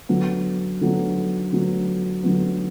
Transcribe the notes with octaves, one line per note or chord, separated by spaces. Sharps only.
D3 F#3 B3
D3 F#3 B3
D3 F#3 B3
D3 F#3 B3